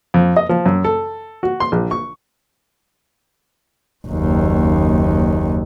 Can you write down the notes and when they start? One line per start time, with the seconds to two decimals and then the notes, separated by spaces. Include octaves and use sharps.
0.14 F2
0.37 D#5
0.49 F3
0.66 F#2
0.84 A4
1.43 F#4
1.60 C6
1.72 A#1
1.91 C#6
4.07 F#1 D#2